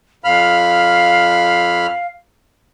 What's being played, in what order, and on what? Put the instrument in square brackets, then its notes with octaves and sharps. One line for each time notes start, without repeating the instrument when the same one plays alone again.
[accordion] F2 B5 F6 [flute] F5